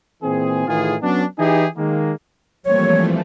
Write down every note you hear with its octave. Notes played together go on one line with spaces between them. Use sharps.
A#2 E3 C4 G#4
A2 D#3 E3 F4 G#4
F#3 B3 C#4 D4
E3 D#4 E4 G4 G#4
D#3 G#3 A#3
E3 F3 G3 A3 A#3 C4 C#5